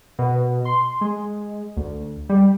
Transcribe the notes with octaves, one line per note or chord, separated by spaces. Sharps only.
B2
C6
G#3
D2
G3